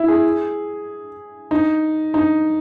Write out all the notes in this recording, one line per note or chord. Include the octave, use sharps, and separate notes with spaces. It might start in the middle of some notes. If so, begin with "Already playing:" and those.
Already playing: E4
G#4
D#4
D#4